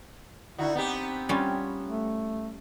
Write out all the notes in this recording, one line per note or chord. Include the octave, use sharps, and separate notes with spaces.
D3 D#4 E4 F#4
B3 C4 D#4 G4
G3 C#4 F4
A3